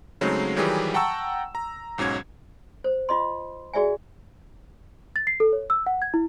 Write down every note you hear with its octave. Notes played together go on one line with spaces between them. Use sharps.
C#3 F#3 G#3 A3 C4 D#4
D#3 E3 F#3 G3 G4 G#4
F#5 G5 A5 A#5 C#6 E6
A#5
B1 G#2 F#3 C#4 G#6
C5
F4 D#5 C6
F#4 G#4 D5 E5 G#5
A6
C7
A4
C#5
E6
F#5
G#6
E4